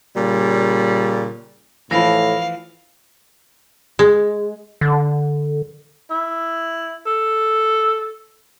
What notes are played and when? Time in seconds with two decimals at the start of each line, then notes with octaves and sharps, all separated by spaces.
0.16 A#2 C#3 G3
1.91 A2 E3 F3 F5 B5 A#6
3.99 G#3
4.81 D3
6.10 E4
7.06 A4